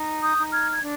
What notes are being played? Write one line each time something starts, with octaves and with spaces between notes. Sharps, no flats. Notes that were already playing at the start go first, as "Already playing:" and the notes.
Already playing: D#4
D#6 G6
D#4
F6 G#6
G#6
D4